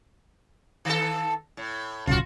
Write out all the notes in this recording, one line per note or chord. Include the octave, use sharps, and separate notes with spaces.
D#3 A4
A2
D1 B1 C#3 F4 F#4